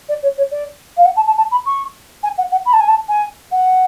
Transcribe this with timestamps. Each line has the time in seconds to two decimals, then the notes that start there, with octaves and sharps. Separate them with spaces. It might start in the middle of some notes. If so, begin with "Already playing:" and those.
0.09 D5
0.22 C#5
0.37 C#5
0.51 D5
0.97 F5
1.05 F#5
1.16 A5
1.27 A5
1.37 A5
1.51 B5
1.65 C#6
2.23 G#5
2.38 F#5
2.51 F#5
2.65 B5
2.73 A5
2.80 G#5
2.88 A5
3.08 G#5
3.52 F#5